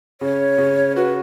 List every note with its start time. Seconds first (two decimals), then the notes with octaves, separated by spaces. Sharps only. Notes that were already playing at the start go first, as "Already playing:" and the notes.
0.21 C#3 C#5
0.58 C#3
0.96 F#4 B4